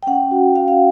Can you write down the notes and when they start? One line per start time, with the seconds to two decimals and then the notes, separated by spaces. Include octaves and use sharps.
0.03 G5
0.07 C#4 F#5
0.31 F#4
0.55 F#4 F5
0.68 F5